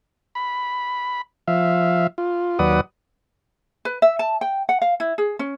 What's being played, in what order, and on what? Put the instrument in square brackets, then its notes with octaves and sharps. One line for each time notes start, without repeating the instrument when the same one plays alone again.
[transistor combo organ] B5
F3 E5 F5
F4
D#2 F#3 B4 D5 F#5 D#6
[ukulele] B4
E5
A5
G5
F#5
F5
E4
G#4
C#4